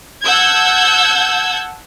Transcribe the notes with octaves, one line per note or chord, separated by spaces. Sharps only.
F#5 A5 E6 G6 G#6